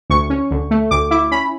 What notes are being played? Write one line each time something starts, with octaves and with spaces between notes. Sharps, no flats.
D2 C#6
C#4
D2
A3
D2 D6
E4 D6
C#4 B5